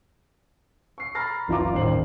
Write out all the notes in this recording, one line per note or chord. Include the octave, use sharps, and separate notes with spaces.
C#6 C7
A#5 B5 F6 A6 A#6 C7
F#1 E3 F4 A#5 D6
D#1 A1 D#2 C5 C7 F#7